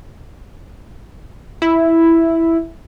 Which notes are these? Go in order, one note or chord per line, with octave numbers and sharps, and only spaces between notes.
E4